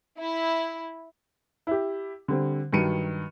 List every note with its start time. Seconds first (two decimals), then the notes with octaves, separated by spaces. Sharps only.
0.16 E4
1.67 E4 G4
2.28 D3 G3 C4
2.73 G2 D#3 F#3 C#7 D#7